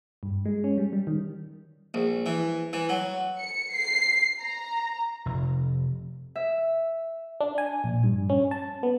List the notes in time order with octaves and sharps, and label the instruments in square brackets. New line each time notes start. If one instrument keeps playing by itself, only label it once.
[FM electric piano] G2
G#3
C#4
G3
G3
D#3
[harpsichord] A#1
E3
E3
F#3
[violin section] C#7
C7
A#5
[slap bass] F1
[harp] E5
[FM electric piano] D4
G#5
A#1
G2
C#4
A5
B3